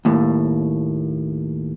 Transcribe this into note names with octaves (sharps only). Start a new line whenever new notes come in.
D#2 A2